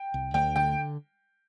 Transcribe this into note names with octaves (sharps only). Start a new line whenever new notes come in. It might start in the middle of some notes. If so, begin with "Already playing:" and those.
Already playing: G5
C2
D2 G5
D3 G5